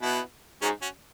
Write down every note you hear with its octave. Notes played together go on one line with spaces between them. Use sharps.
B2 B3 E4
G#2 C#4 F#4
C#4 F#4